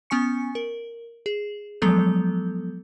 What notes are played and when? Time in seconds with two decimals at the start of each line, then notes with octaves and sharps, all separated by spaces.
0.10 B3 C#4 G#5 C#6 C#7
0.55 A#4
1.26 G#4
1.82 F3 F#3 G#3 B3 A4 G6